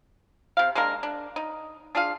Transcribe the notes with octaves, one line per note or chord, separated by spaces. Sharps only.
C3 F5
G#3 A#3 D4 A#4
D4
D#4
D4 F4 G#4 F5